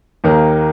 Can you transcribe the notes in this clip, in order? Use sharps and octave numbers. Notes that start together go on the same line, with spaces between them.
D#2 D#3 A#3